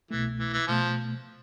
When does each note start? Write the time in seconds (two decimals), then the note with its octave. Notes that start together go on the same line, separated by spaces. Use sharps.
0.11 C2 B2 E3 A3
0.39 E3
0.53 E3
0.67 B2 F3 A3